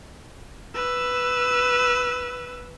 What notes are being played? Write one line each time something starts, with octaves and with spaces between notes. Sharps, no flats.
B4 E6